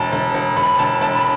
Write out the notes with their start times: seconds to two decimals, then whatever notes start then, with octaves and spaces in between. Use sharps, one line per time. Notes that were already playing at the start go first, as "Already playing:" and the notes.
Already playing: E1 A5
0.12 E1
0.34 E1
0.56 E1 B5
0.79 E1 A5
1.01 E1 A5
1.15 B5